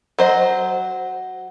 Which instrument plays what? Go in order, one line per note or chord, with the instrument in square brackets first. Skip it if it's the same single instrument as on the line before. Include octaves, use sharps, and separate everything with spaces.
[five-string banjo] F#3 C5 D#5